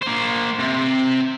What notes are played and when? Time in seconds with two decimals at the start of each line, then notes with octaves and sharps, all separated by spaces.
0.03 A#3 C5
0.59 C3